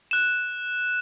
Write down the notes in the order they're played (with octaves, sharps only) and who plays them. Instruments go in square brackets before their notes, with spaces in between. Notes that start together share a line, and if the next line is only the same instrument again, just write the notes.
[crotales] F#6 E7